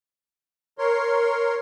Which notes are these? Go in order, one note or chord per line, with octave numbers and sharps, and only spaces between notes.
A#4 C#5 C6